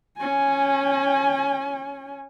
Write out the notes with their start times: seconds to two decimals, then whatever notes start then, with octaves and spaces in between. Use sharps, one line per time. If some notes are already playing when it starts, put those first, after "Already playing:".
0.17 C#4 G#5